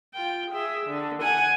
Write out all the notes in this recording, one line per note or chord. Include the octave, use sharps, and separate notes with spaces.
F4 G5
G#4 E5
D3
F#5 G#5